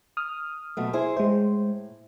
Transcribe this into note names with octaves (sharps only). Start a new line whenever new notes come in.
D#6 F6
B2 F#3 A3
E4 G#4 C5
A2 G#3 C5